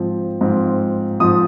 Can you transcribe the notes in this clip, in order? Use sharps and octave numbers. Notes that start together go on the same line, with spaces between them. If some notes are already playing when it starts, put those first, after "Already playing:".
Already playing: G#2 F3 C4
G#2 F3 C4
G#2 F3 C4 D#6